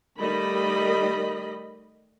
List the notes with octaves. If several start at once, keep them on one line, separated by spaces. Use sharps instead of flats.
D#3 G3 A3 D#5 B5